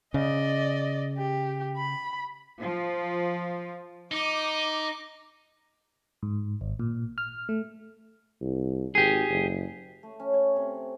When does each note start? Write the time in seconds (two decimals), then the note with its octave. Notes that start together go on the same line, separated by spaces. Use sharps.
0.14 C#3 D5 D#5
1.18 G4
1.77 B5
2.59 F3
4.11 D#4 D6
6.23 G#2
6.61 G#1
6.80 A#2
7.18 F6
7.49 A3
8.41 C2
8.95 G#1 G4 G#4
9.29 F#1
10.03 A3
10.20 C#4
10.34 C#5
10.56 C3